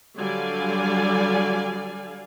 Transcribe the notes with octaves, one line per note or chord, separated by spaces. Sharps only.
D3 F#3 G3 D5 F5 G#5